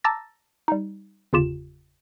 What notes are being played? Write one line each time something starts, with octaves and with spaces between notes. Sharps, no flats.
A5 A#5 D6 E6 A6 A#6
G3 D#4
G1 E2 C#3 F4 G4 E7